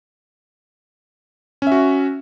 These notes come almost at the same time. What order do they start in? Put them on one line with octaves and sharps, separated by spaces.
C#4 E5 F#4